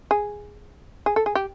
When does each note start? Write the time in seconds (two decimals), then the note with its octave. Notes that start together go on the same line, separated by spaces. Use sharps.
0.11 G#4
1.06 G#4
1.16 A4
1.26 G#4
1.35 G4